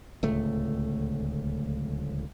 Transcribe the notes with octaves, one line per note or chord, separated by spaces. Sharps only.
D1 C#2 A3